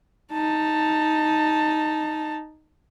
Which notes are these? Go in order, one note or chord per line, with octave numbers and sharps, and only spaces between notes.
D#4 A5